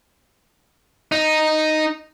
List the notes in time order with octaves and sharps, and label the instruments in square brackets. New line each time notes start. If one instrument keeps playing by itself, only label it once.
[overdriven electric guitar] D#4